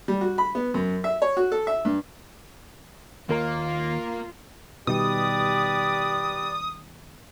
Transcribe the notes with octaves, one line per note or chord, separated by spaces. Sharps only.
G3
F#4
B5
B3
F#2
E5
C#5
F#4
A4
E5
G2
D#2 A#3 F4 A#4 A#5
B2 D#3 G3 G4 B4 D5 D#6